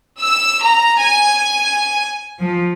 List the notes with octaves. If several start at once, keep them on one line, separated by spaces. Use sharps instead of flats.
E6
A#5
G#5
F3